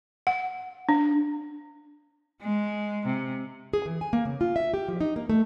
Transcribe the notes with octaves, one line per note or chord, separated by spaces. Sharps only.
F#5
D4
G#3
C3
G#4
E3
G#5
A#3
C#3
F4
E5
G4
F3
D#4
A#3
A3